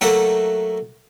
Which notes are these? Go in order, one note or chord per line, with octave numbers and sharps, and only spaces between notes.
F#3 A3 A#3 F#4 A4 E5